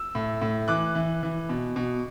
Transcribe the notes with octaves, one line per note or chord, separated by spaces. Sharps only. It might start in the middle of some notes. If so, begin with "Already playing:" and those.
Already playing: E6
A2
A2
E3 D6 F#6
E3
E3
B2
B2